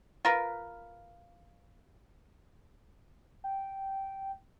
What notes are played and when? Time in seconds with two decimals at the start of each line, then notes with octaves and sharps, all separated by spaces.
0.25 F4 A#4 B4
3.44 G5